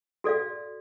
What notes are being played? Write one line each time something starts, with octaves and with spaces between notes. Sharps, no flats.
F#4 A4 D5 F5